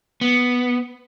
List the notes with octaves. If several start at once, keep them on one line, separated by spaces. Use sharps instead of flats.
B3